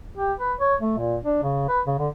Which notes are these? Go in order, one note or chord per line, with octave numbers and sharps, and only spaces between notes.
G4
B4
C#5
A3
A#2
D4
C#3
B4
C#3
D3